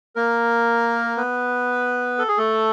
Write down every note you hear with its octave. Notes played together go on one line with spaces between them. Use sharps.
A#3 A#4
B3 B4
A4
G#4
A3 A4